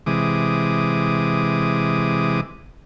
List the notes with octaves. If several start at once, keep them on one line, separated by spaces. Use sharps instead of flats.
C3 E3 G#3 D6 D#6